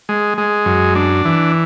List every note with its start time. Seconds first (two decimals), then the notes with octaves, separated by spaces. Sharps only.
0.09 G#3
0.38 G#3
0.66 F#2
0.95 D4
1.25 E3